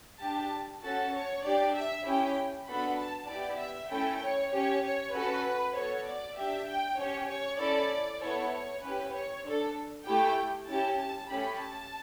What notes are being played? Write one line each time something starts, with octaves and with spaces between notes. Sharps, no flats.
D4 G4 A5
C#4 F#4 A4 A5
C#5
D4 G4 D5
E5
C#4 E4 G4 G5
B3 D4 F#4 A4 B5
A5
B3 E4 G4 D5
E5
A3 C#4 E4 A4 G5
C#5
C#4 G4 C#5
C#5
C#4 F#4 A4 B4
B3 F#4 A4 C#5
D5
D4 G4 E5
G5
C#4 G4 C#5
C#5
C#4 E4 A4 D5
B3 E4 A4 C#5
C#5
C#4 E4 G4 B4
C#5
D4 A4
A3 E4 G4 G5
C#4 E4 G4 A5
A5
A3 C#4 G4 B5
A5